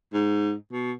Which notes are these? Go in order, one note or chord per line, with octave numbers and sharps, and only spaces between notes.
G#2
B2